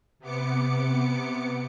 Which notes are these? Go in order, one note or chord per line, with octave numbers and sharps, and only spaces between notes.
C3 B3 D6 C#7